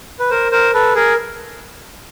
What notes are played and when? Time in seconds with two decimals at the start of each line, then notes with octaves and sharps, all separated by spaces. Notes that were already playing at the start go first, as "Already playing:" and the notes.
0.20 B4
0.30 A#4 C5
0.51 A#4 C5
0.74 A4 B4
0.95 G#4 A#4